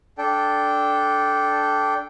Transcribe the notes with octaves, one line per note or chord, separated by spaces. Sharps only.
D4 A4 G5